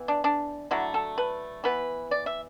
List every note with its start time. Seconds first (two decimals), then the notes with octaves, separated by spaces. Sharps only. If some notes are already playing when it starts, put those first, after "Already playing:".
Already playing: E3 B3
0.08 D4
0.24 D4
0.71 D3 F#3 A3 E4
0.94 A4
1.18 B4
1.64 E3 B3 B4
2.11 D5
2.26 E5